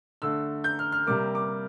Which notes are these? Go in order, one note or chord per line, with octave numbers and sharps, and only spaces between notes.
D3 A3 E6
G6
F6
F6
C3 G3 A#3 D6
D6